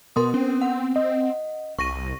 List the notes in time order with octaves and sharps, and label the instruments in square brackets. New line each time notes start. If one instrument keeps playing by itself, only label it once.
[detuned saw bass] B2 [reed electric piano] B3 [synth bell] A#4 C6 D#6
[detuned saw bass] C4 [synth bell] C#4
[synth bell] F#5
[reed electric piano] D#5
[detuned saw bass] C2 [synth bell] C#6 A#6 D#7